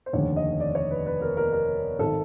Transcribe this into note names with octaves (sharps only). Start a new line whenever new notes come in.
C5
F1 D#2 D3 C#5
D#5
D5
C#5
B4
B4
A#4
A#4
A#4
G#1 D#3 A4